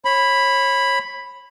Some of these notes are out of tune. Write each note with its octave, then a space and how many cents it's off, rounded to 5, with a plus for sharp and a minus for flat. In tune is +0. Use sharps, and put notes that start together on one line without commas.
C#5 -30 B5 +0